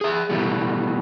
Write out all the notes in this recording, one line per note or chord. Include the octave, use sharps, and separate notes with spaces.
G#4 E5
B2 E3 G3 A3